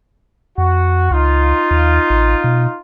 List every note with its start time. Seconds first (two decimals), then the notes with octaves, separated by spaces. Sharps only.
0.58 F2 F#4
1.11 C#2 D#4 F4
1.71 D#2
2.10 A1
2.44 B2